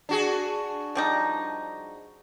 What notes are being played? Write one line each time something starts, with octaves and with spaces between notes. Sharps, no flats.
D4 F#4 G#4
F3 G3 D#4